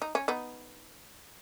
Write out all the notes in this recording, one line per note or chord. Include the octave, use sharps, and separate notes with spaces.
D#4
C#4
B3 D#4